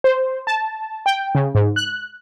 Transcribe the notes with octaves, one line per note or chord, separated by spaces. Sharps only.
C5
A5
G5
C#3
G#2
F#6